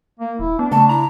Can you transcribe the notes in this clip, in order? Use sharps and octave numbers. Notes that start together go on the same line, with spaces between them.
A#3
D#1 E4
B3 D4
C#3 A3 A5
E4 A#5